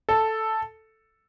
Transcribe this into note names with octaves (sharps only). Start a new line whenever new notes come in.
A4